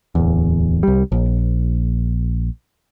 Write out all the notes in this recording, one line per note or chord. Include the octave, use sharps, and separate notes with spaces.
D1 E2
C2 G3
A#1